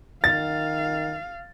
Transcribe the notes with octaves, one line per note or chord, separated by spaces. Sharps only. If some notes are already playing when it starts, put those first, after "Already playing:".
D#3 F5 A6